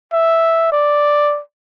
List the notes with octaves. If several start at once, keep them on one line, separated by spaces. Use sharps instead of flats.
E5
D5